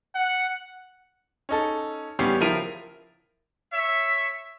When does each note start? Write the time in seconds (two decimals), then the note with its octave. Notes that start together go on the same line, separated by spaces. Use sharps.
0.16 F#5
1.49 C#4 D#4 A4
2.19 A1 G3 B3 C#4 G4 C7
2.40 C#2 F3 E4 A#4 D#7 F7
3.73 C#5 E5